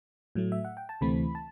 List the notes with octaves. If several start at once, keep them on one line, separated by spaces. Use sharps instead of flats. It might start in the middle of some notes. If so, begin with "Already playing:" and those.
A2 F#3 A3
E5
F#5
G5
A5
D2 C3 E3 A3 C4 B5
A5